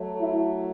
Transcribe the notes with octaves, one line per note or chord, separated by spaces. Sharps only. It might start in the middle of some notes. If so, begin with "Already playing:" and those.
Already playing: F#3 A3
E4